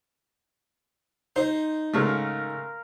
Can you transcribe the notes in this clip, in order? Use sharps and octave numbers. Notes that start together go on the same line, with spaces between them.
D#4 C5
G#2 C#3 A3 A#4 F5